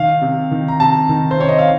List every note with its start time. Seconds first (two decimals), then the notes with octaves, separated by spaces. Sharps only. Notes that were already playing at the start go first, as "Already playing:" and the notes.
Already playing: D#3 F5
0.21 C3
0.51 D#3
0.68 A#5
0.80 C3 A5
1.09 D#3
1.31 C5
1.38 C3 C#5
1.49 D#5
1.59 F5